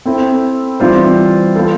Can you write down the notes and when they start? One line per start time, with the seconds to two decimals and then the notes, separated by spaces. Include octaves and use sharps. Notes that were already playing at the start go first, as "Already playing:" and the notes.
0.06 C4 E4 A4
0.80 E3 G3 C4 F4 C5
1.55 B3 F4 A4